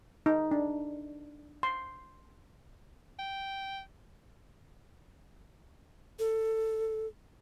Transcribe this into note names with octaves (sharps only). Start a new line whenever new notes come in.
D#4
D4
C6
G5
A4